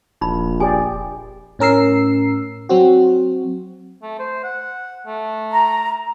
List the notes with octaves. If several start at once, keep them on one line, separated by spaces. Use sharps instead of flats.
D#1 A#1 D#4 B5
F1 G4 G#4 D5 G#5
A2 C#4 A#4 E6 C7
F#3 C4 F#4
A3
C5
F#5
A3
A#5